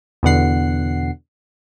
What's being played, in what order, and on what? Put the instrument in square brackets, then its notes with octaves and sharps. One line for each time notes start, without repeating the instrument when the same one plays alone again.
[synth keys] E2 B2 D3 F#5 C7